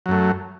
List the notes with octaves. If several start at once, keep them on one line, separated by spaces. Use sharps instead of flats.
F#2 F#3 A3